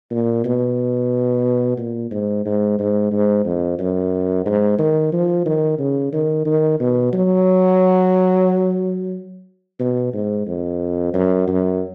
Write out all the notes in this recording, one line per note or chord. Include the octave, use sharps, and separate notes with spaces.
A#2
B2
A#2
G#2
G#2
G#2
G#2
F2
F#2
G#2
D#3
F3
D#3
C#3
D#3
D#3
B2
F#3
B2
G#2
F2
F#2
F#2